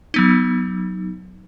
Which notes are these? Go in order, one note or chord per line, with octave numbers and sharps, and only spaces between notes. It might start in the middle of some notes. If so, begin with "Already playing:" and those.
F#3 B3 D#4